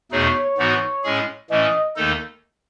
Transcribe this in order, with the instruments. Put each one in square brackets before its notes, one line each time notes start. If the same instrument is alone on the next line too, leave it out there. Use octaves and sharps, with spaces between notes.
[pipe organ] E2 B2 A3 D#4 G#4 [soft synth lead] C#5
[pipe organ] G#2 E3 B3 D#4 F#4
A2 G#3 C#4 G#4
[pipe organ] A2 E3 A3 C#4 [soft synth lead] D#5
[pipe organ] D#2 D#3 A3 D#4 A4